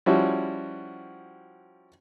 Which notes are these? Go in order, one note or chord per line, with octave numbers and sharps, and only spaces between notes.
F3 G3 C#4 E4 F#4